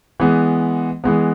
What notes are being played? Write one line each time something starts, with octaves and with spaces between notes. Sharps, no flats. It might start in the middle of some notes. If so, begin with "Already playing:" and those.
E3 G#3 B3
E3 G#3 B3